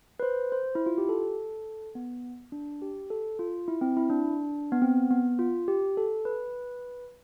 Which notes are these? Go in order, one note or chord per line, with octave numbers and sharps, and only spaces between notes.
B4
C5
C5
E4
F4
G4
A4
B3
D4
G4
A4
F4
E4
C4
E4
D4
B3
C4
B3
F4
G4
A4
B4